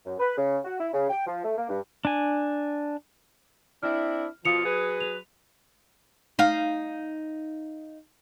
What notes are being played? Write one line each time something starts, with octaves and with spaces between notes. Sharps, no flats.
F#2
B4
C#3
F#4
E4
C#3
G5
F3
A3
A#3
G2
D4 G#5
C4 D4 E4 F6
B2 F3 F4 D#6 C#7 F7
F#3 G#4 B4
F7
D#4 F5